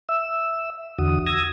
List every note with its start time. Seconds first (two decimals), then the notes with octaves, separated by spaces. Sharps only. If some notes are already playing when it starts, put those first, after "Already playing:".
0.09 E5 E6
0.99 E2 D3 F#4 D#6
1.27 D#6 E6 G#6 A#6